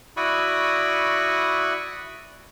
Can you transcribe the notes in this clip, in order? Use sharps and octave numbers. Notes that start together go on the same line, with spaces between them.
E4 F#4 D5 B5 C#6 D#6